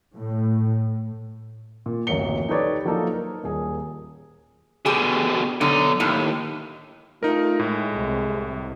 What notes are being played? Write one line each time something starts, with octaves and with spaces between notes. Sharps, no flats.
A2
A#2
D1 A1 F#2 A#3 C#7 G7
D#4 G4 A4 B4 C#5 D5
F3 F#3 A#3 D#4 A4
A#4
D#1 G#4
B2 D3 G4 G#4
B1 D3 D#4
D#2 A2
A3 D#4 F4 A#4
A2 G#3
C2 C3